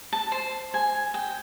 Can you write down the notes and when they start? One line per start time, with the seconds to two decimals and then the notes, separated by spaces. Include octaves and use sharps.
0.13 A5
0.32 C5
0.74 G#5
1.14 G5